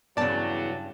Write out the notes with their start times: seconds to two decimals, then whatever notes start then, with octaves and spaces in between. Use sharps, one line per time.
0.17 E2 G2 C#3 F#3 D5 A5